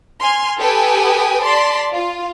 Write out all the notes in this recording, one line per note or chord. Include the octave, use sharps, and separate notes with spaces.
G#5 C6 F6
G4 A4 B4 G5 G#5 D#6
D5 A5 C6 B6
F4